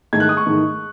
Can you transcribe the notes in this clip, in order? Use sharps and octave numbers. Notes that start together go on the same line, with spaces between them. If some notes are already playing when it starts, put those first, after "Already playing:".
G#2 D#3 A3 D#4 G#6
F#6
D#6
C#6
G#2 D#3 A3 D#4